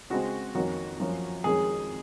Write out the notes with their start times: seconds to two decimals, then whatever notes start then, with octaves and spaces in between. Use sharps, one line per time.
0.10 C#3 G#3 C4 F#4
0.55 F2 D#3 A#3 C#4 F#4
1.00 F#2 F3 A#3 C#4
1.44 F2 D#3 G#3 C#4 G#4